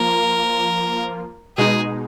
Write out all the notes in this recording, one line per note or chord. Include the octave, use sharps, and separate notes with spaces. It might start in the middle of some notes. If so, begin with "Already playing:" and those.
Already playing: F3 A#3 F4 A#4
B2 G#3 D#4 G#4